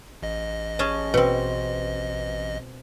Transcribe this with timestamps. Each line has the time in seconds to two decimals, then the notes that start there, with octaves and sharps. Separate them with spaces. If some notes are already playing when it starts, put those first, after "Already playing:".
0.23 A1 D#5
0.79 C#4 G#4 A5
1.14 B2 C4